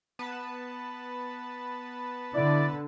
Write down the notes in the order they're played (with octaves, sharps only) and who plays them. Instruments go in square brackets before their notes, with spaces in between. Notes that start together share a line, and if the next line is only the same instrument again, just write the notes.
[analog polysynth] B3 B4 A5
[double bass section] D3 [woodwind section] E4 D5